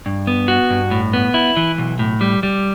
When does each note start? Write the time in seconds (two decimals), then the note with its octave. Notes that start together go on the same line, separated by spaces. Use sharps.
0.06 G2
0.27 B3
0.48 F#4
0.70 G2
0.91 A2
1.13 B3
1.34 E4
1.57 E3
1.78 B1
1.99 A2
2.21 G3
2.43 G3